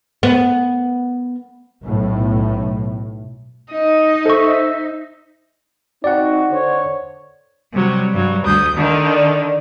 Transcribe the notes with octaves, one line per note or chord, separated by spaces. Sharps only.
B3
B1 A2
D#4 D#5
A4 C5 E5 C#6
C4 D#4 F#4 D5 F#5
D3 C5 C#5
C3 F#3 G3
G2 F#3
D2 D#6 G6
D3 D#3
D5